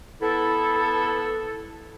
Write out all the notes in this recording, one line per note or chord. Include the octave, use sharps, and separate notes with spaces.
B3 E4 A4